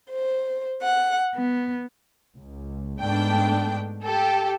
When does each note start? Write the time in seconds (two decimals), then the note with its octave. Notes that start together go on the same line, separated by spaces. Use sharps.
0.10 C5
0.82 F#5
1.35 B3
2.35 C#2
3.00 G#2 A3 B3 D4 G5
4.03 G4 A4